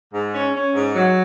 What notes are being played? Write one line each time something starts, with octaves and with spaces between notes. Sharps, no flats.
G#2
C#4
C#4
G#2
F#3